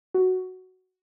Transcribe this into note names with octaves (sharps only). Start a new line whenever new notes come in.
F#4